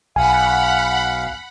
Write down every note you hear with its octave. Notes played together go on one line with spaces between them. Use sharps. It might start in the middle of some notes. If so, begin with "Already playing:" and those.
B1 F5 F#5 G#5 B5